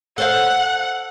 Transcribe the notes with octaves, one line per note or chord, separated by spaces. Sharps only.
A4 C5 F5 F#5